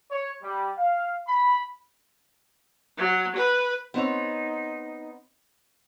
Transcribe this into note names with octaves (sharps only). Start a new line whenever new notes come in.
C#5
G3
F5
B5
F#3
B4
B3 C4 D#4 C#5